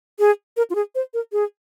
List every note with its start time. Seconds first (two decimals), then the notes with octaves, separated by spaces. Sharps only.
0.19 G#4
0.57 A#4
0.70 F4
0.75 G#4
0.95 C5
1.14 A#4
1.32 G#4